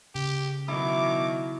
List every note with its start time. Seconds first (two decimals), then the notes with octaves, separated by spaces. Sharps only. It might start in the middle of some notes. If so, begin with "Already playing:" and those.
0.15 C#3 G4
0.68 B2 D#3 F#3 E4 D6